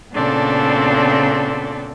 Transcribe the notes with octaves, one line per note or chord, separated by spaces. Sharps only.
A#2 C#3 B3 C4 D4 A4